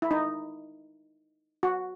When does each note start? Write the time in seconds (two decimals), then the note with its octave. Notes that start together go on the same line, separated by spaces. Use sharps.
0.02 E4
0.11 D#4
1.63 F#4